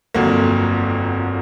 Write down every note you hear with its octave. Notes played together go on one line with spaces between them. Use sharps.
G1 F2 D3 F#3 A#3